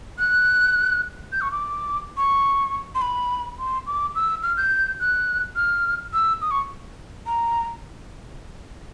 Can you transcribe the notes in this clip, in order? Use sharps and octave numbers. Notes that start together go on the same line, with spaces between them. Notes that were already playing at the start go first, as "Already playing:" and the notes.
F#6
G6
C#6
D6
C#6
C6
B5
C6
D6
E6
F6
G6
F#6
F6
E6
D#6
C#6
A#5